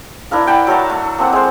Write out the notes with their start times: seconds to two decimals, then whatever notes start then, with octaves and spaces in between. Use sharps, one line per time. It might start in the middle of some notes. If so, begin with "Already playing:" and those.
0.31 D4 E4 A#4 F5
0.47 F#5 G5 A5 B5
0.67 F#3 A3 A#4 A5
0.90 A3
1.18 A#3 C4 A4 F#5
1.33 G#3 C5